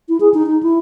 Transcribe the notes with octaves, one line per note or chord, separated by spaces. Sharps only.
E4
G#4
D#4
D#4
E4